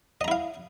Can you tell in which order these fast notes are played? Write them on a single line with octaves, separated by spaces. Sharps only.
D#5 A#5 E4 F5